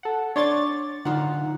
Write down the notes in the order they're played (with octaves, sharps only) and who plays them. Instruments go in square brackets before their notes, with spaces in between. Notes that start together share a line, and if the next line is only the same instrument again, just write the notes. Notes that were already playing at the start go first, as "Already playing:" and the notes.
[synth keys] A4 F#5
[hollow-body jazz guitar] D4 C6 [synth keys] C#5 D5 A6
[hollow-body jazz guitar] D3 D#4 F4 [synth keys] F#5